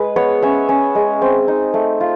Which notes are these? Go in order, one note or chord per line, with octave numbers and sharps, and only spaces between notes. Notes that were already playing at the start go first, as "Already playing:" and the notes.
Already playing: G#3 B4
B3 C#5
C#4 E5
C#4
G#3
C4
D#4
A3
F4